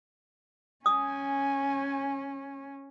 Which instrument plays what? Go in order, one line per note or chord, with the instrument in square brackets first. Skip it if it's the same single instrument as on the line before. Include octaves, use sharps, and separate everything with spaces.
[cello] C#4 [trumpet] G#5 [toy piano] D#6